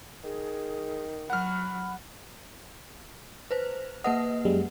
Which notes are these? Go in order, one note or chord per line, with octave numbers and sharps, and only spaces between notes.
D#3 G#4
F#3 F#5 B5 F6
B4 C5
A#3 B4 D#5 F#5
F#2 G3 G#3